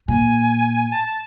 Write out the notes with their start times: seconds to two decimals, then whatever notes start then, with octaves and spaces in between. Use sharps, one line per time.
0.08 A#2 G#5
0.92 A5